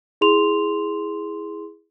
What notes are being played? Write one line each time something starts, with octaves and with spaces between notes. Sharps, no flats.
E4 G#4 C6 F7